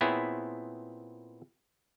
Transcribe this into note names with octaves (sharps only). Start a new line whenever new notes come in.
A#2 B3 C4 E4 G#4 C#5